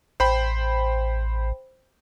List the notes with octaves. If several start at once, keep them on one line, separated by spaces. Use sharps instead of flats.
A1 C5 G5 B5